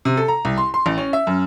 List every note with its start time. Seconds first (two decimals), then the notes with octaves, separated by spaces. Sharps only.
0.05 C3
0.17 A4
0.28 A#5
0.45 C2
0.58 C6
0.74 C6
0.86 A1
0.98 C#4
1.13 E5
1.27 F#2